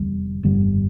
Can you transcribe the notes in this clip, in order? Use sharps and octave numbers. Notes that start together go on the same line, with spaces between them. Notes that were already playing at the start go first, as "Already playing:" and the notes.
Already playing: F1 E2 D3 G3
G1 F2 D3 G3